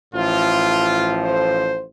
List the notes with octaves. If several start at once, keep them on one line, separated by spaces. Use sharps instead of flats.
A1 A2 F3 F4
C5